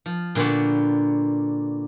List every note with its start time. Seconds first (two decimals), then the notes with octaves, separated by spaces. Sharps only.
0.06 F3
0.35 A#2 D3 B3 F#4 G4